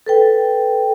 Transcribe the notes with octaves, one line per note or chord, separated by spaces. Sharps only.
A4 B4 G5